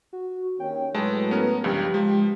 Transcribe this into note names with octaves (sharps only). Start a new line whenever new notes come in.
F#4
D#2 D#3 C#4 G5
A2 F#3 G#3 A3 B4 A5
B3 C#4 A#4
C#2 G2 F3 G4
F3 G#3